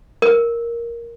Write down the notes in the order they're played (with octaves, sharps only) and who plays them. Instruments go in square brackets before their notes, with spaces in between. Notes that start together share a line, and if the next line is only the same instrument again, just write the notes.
[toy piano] A#4